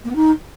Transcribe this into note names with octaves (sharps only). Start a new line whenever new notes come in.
A#3
B3
D#4